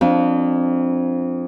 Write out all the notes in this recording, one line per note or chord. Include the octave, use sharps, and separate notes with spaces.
F2 D4